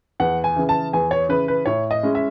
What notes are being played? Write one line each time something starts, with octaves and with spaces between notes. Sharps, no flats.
E2 F#5
G#5
C#3 E3
A5
E2 G#5
C#5
C#3 E3 B4
B4
A2 C#5
D#5
G#3 C#4 E4
E5